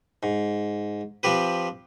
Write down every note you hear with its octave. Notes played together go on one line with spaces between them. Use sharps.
G#2
F3 C4 G4 B4